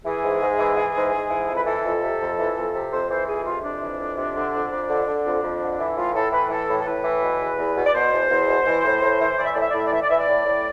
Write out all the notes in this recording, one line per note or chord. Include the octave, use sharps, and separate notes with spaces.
E3 G#4
G#2
G#2
E3
E3
G#2
G#2
E3
F2 A4
B4
E3 A4
F2
C3
F2
E3
F2
C3
F2 C5
E3 C5
F2 G#4
C3 F4
F2 D4
E3
F2
C3
D3
F2
F2
D3
D3
F2
F2
D3
E3 E4
A2 F4
A2 A4
E3 B4
E3 A4
A2
A4
A2 B4
E3
B2
E2
E2
B2
D5
B2 C5
E2
E2
B2
E3
A2
A2
E3
E3 D5
E5
A2 D5
E5
D5
A2 E5
D5
E3 E5
D5
E3 E5
D5
A2
A2